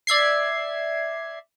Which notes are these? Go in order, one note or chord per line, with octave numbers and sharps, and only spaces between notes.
D5 E5 G#6 C7